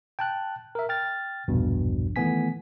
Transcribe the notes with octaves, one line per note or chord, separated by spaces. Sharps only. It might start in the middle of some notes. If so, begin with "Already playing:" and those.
G5 A5 F#6
A#4 E5
G5 F6 A6
A#1 E2 G2 B2
D#3 E3 A3 B3 G#5 B6